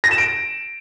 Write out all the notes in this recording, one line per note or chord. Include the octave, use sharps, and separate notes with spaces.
A#6
E7
D7